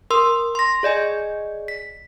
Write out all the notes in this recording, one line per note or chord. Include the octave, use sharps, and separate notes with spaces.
A#4 C6 E6
C6 A#6
G#4 D5 D#5 G#5
B6